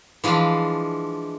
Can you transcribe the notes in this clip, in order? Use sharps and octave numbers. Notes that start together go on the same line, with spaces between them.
E3 F3 G#3 D4 F4